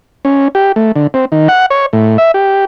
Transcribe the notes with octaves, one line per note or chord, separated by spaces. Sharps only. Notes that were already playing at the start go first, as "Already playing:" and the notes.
C#4
G4
A3
D3
C4
D#3
F#5
C#5
A2
E5
G4